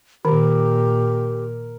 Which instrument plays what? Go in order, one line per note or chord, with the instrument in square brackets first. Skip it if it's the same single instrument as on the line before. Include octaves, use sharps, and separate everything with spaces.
[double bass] A#2 [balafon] D#3 [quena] G4 [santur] A#4